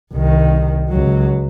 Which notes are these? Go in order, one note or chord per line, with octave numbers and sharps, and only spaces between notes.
C2 D#3
C#2 F#3